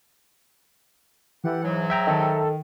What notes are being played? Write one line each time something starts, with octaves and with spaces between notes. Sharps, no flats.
E3 G4 A4 F#5
G#2 F#3
E5 G5 A#5
D#3 A4